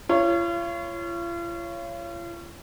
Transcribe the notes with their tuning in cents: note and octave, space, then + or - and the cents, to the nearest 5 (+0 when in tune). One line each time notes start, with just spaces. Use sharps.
F4 -40 C#5 +0